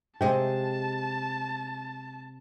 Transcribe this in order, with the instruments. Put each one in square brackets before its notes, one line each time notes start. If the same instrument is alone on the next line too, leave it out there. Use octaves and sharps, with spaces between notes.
[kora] C3 G#3 [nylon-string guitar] C5 D#5 G5 [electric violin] A5